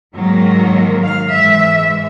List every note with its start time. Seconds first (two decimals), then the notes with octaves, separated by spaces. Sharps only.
0.15 G#2 D#3 F#3 A#3
1.02 F5
1.30 G#2 E3 G#3 E5